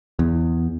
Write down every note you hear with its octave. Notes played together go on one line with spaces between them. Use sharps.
E2